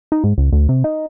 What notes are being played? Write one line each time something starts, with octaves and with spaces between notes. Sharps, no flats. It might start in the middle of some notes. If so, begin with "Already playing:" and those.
D#4
G#2
C#2
D2
C3
D#4